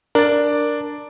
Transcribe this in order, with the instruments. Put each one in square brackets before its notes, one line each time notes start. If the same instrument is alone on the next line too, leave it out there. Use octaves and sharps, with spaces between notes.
[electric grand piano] D4 D5 [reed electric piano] A#4